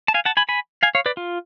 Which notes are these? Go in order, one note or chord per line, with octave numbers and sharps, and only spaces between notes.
A5
F5 G#5
F#5 A5
G#5 B5
G#5 B5
F5 G#5
C#5 F5
B4 D5
F4